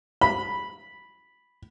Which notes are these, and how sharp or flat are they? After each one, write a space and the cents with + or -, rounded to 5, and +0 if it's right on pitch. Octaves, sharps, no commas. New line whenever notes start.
B5 -5